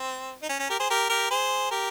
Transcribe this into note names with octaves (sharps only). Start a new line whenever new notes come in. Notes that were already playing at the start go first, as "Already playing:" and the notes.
Already playing: C4
D#4
C#4
C#4
G4 A#4
G#4 C5
G4 A#4
G4 A#4
G#4 C5
G4 A#4